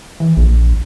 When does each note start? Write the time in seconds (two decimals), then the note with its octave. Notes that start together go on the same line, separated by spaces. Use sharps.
0.20 E3
0.37 A#1